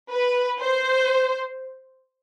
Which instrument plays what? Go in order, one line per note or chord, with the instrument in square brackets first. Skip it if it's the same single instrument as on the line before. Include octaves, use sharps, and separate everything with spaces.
[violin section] B4
C5